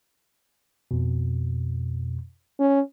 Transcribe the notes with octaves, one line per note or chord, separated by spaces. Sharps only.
F2 B2
C#4